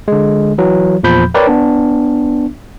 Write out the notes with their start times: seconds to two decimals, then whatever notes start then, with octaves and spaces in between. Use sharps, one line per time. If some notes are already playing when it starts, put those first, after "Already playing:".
0.08 D3 G#3
0.58 E3 F#3
1.03 E2 A#2 F3 B5 G6
1.34 A#4 B4 C#5 D5 G5
1.47 B3 D4